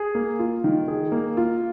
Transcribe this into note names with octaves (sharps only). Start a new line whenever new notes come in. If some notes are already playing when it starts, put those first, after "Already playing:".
Already playing: G#4
A#3
F4
D#3
G#4
A#3
F4